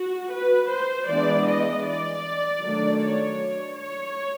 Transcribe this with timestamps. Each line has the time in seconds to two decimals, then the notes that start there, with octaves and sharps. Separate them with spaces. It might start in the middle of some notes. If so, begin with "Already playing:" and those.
Already playing: F#4
0.32 B4
0.69 C5
1.08 E3 G#3 B3 D4 D5
1.46 D#5
1.84 D5
2.60 D#3 F#3 A3 D4
2.99 C#5
3.74 C#5